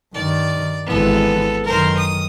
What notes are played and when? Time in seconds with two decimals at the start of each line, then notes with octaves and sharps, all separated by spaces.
0.14 G2 D#3 D5
0.86 G#1 E3 B3 A4
1.65 F#2 D#3 A#4 C5
1.97 D#6